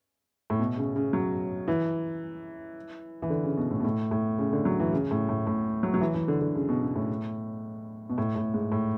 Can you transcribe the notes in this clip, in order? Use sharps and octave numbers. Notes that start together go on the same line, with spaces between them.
A2
B2
C#3
C#3
F#3
E3
E3
D3
C#3
B2
A2
B2
A2
A2
C#3
D3
F#3
E3
C#3
A2
A2
A2
F#3
F#3
E3
E3
D3
D3
C#3
B2
C#3
A2
B2
A2
A2
G#2
A2